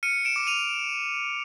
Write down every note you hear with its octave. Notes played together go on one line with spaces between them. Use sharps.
F6 C#7 D#7
D7 E7
D6
D#7 F7